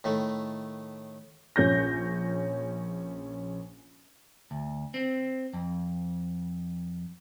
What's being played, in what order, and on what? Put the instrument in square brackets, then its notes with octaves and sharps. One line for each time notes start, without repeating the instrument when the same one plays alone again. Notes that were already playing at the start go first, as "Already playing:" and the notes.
[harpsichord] A2 D#3 A3
[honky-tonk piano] A#1 C#4 G6 A#6
[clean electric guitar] D2
C4
F2